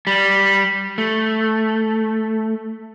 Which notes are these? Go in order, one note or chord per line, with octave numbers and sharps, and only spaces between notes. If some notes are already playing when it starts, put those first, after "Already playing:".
G3
A3